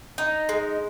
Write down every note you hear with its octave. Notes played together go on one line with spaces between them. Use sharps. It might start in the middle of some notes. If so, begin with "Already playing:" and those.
D#4
G#3